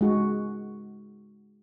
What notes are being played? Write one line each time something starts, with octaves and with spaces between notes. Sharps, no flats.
G#3 F#4